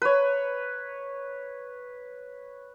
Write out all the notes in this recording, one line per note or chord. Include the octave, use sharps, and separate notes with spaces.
B4 C#5